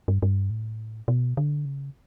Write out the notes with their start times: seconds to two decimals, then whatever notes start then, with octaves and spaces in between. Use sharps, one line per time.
0.08 G2
0.22 G2
0.50 A2
1.08 B2
1.37 D3
1.65 C#3